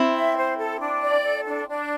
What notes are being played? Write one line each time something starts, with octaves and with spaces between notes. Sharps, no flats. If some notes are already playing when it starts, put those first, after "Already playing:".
Already playing: C4 E4
E5
C5
A4
D4
D5
A4
D4
D4